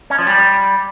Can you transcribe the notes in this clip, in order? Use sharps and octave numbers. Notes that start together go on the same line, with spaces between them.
C#4
F3
G3